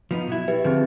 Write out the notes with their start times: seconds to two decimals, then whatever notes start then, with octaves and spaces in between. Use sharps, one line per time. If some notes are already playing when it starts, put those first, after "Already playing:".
0.11 F3 B3 D#4
0.28 B2 F#3 E4
0.48 G4 B4 E5
0.64 D3 F3 C4 G#4